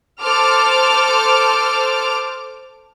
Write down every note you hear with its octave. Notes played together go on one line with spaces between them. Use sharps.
A4 C5 D6 F6